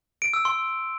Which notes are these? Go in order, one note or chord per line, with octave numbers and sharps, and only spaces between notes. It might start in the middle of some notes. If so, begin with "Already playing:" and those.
D7
E6
C6